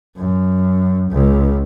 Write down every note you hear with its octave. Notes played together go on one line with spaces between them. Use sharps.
F#2
C#2